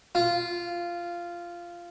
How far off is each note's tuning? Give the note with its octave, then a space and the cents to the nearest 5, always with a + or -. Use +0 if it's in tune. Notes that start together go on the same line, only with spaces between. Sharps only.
F4 -10